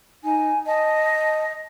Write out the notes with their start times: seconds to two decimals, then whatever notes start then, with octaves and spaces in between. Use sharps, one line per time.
0.24 D#4 G#5
0.66 D#5 A5